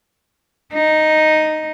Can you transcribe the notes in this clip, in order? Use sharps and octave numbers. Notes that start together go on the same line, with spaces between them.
D#4